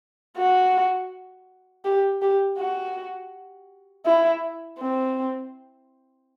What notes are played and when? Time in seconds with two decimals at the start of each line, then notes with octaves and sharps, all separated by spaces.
0.37 F#4
1.85 G4
2.22 G4
2.58 F#4
4.06 E4
4.79 C4